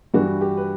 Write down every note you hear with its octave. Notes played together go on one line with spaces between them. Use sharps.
G2 E3 G3 F#4
G4
B4